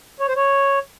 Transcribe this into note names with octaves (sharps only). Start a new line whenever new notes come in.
C#5
C5
C#5